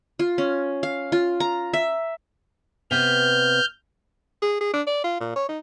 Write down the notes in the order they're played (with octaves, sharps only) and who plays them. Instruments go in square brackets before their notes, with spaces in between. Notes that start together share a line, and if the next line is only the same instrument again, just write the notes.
[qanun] F4
C#4
F5
F4
A#5
E5
[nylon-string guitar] C3 B3 [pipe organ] F6 G6
[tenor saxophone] G#4
G#4
D4
D5
F4
A#2
C#5
D#4